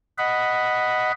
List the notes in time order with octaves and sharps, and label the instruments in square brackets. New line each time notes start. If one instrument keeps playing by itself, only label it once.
[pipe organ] D#5 F#5 B5